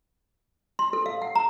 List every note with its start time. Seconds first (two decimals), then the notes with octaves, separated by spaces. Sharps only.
0.79 C6
0.93 A4
1.06 F5
1.22 F#5
1.35 A#5